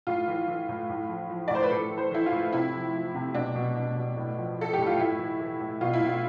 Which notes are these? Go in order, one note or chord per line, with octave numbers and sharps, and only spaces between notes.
A2 F4
E3
E3
A2
A2
F3
F3
D5
A2 C5
B4
A2 A4
E3
C5
E3 E4
F4
A2
C3 E4
F3
F3
C3
B2 D4
B2
B2
B2
A2
F3
F3 A4
A2 G4
F4
A2 E4
E3
E3
A2
B2 F4
E4
B2
F4